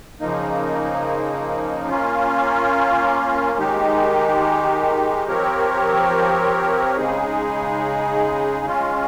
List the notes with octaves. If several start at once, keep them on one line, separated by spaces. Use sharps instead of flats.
C#3 F3 A#3 D#4
A#3 C#4 F4
D#3 G#3 D#4 G4
F3 C4 G4 A#4 C#5
C#3 G#3 D#4 G#4
G#3 C#4 F4